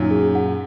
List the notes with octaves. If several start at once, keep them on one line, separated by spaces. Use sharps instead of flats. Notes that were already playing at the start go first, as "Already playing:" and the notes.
Already playing: F#2 A#2 D#4
G#4
F#5